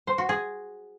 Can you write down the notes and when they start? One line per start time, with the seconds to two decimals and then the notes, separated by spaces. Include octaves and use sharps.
0.07 C5
0.18 F#4
0.29 G#4